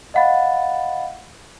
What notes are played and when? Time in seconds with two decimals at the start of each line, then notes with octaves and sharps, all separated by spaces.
0.14 D#5 F5 F#5 B5 A6